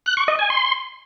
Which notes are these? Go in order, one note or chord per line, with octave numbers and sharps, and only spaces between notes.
F#6
C#6
D#5
G#5
C6